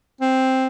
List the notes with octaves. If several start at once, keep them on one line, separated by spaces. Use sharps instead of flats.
C4